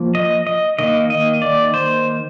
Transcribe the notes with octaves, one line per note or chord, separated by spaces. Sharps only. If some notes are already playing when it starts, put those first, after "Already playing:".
Already playing: F3 A#3
D#5
D#5
D#3 A#3 D#5
D#5
D5
C5